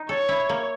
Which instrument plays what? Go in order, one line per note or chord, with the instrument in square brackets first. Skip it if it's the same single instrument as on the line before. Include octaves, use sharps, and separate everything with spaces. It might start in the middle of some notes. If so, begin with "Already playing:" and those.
Already playing: [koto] D#4
[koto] A4 [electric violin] C#5
[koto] E4
A#3